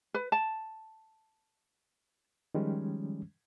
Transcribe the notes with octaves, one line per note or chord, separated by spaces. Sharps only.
B4
A5
D#3 F3 G3 G#3 C#4